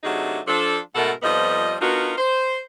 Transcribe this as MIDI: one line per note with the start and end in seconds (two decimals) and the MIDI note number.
0.04 0.39 48
0.04 0.39 54
0.04 0.39 57
0.04 0.39 62
0.04 0.39 63
0.04 0.39 68
0.47 0.78 53
0.47 0.78 62
0.47 0.78 69
0.95 1.12 44
0.95 1.12 47
0.95 1.12 57
0.95 1.12 69
0.95 1.12 70
0.95 1.12 78
1.23 1.74 41
1.23 1.74 53
1.23 1.74 55
1.23 1.74 59
1.23 1.74 75
1.81 2.13 59
1.81 2.13 62
1.81 2.13 63
1.81 2.13 65
1.81 2.13 66
1.81 2.13 70
2.17 2.61 72